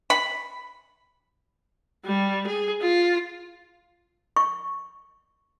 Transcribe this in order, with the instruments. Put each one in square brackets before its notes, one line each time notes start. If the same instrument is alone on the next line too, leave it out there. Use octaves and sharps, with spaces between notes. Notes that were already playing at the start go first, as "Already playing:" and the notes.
[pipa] B5
[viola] G3
G#4
F4
[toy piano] C#6